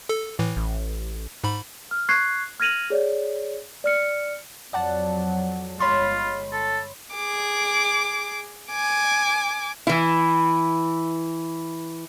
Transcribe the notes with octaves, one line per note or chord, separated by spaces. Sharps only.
A4
A2 E3
A1
G#2 B5
F6
C#6 F#6 G#6 C7
F6 G#6 A#6 D#7 F7 F#7
G#4 C#5 D5
D5 F6 C#7
F2 F#3 D5 F#5 A5
G1 G#3 F4 C#5 B5 C6
A4
G#4 D6
G#5 D6
E3 E4